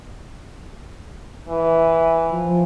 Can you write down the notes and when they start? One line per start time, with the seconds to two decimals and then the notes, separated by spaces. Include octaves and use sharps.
1.48 E3
2.31 F3